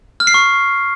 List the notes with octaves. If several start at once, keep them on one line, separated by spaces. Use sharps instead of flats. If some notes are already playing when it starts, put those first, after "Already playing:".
F6
C7
C#6